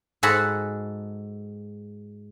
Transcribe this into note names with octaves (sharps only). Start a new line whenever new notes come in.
G#2 F#4 G#4 A4 B5